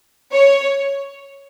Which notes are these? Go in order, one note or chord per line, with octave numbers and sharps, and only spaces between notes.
C#5